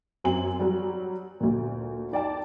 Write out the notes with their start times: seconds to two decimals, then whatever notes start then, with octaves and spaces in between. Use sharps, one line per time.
0.24 F#2 C4 G#5 F#7
0.59 F#3 G3
1.40 D2 A#2
2.12 D#4 D5 G5 A5